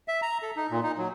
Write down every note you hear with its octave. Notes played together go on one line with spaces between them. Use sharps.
E5
A#5
A4
D#4
A#2
D#4
F#3